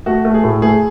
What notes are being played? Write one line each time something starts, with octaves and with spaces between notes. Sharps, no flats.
A3 F#4
A3
G#4
A2
A3 G#4